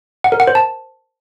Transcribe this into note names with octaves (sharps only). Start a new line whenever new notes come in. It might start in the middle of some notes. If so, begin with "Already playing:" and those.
F#5
A#4
F#5
C5
A5